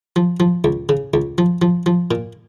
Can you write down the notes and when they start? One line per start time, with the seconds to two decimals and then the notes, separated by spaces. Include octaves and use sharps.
0.16 F3
0.40 F3
0.64 C#2
0.89 C#3
1.14 C#2
1.38 F3
1.62 F3
1.86 F3
2.11 A#2